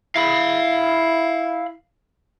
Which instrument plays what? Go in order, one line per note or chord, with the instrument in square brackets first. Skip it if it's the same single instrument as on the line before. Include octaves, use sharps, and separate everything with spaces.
[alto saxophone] E4 [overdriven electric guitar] F5 B5